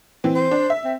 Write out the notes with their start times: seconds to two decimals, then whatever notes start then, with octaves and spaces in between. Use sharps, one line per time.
0.24 E3 C4
0.36 C5
0.51 D4
0.70 E5
0.84 C4